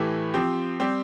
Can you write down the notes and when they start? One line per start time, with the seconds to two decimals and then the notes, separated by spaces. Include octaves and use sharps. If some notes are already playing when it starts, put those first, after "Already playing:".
Already playing: A2 E3 A3 E4 G4
0.34 F3 C4 G4
0.80 G3 C4 G4